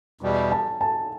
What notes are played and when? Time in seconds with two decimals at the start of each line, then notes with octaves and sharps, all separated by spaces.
0.21 E2 B2 G3
0.52 A5
0.81 A5